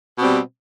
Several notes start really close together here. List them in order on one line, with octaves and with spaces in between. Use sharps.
B2 C4 G3